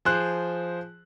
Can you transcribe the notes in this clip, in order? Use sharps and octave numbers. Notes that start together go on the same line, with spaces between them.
F3 G#4 C5 F#6